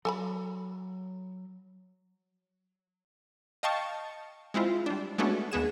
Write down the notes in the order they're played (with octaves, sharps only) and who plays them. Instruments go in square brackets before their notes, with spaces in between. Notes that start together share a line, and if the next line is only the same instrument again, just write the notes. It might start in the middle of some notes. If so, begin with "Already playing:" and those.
[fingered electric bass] F#3 [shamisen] A4 G#5 B5
[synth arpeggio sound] D#5 F5 G5 A5 C#6
G#3 C4 E4 F4
G3 D4
G#3 A3 B3 C#4 D4 F#4
D#2 B3 G#4 E7